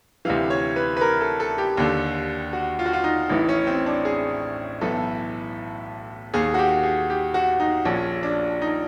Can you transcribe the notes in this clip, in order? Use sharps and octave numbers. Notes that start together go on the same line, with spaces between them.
D2 C3 E3 F5
C#5
B4
B4
A#4
A4
A4
G4
D#2 D3
F#4
F4
F#4
F4
D#4
A1 A2 E3 D#4
C#4
C4
D4
G#4
B1 A2 E3 A4
D#2 D#3 G#4
F#4
G4
G#4
G4
F#4
D#4
A#1 A#2 C#4
D4
D#4